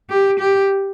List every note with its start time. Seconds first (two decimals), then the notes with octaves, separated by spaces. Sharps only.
0.10 G4
0.40 G4